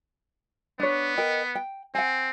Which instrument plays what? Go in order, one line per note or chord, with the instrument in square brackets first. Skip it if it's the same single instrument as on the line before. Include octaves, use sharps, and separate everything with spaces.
[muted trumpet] B3 [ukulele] D4 C#5
[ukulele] A#4 D#5 G5
G5
[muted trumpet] C4 [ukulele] F#5 G#5